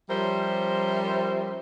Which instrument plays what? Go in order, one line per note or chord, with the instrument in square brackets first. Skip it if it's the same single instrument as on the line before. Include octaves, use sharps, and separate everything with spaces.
[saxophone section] F3 G3 C#4 A#4 C5 E5